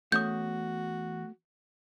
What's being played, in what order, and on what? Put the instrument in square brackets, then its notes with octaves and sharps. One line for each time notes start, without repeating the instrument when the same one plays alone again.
[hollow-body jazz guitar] E2 C#4 [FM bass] A3 [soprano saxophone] F#4 [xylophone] D#6 G6